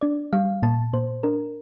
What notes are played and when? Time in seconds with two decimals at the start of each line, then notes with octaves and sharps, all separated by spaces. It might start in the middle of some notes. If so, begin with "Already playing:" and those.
0.01 D4 D5
0.33 G3 F5
0.62 A#2 A5
0.93 A#2 C5
1.23 D4 A#4